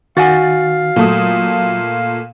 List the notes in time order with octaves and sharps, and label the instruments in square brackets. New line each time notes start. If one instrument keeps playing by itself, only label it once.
[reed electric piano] D#3 [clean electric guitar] F#4 F#5 G#5 [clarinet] F5 [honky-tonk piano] A6
[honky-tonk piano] A#2 A3 D#6 [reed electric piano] F#3